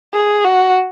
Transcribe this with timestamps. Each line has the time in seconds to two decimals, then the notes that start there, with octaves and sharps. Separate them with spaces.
0.14 G#4
0.45 F#4